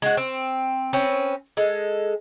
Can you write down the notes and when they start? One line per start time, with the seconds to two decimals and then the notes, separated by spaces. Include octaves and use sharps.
0.02 G#3 F#4
0.17 C4
0.93 C4 C#4 B4
1.57 G#3 A4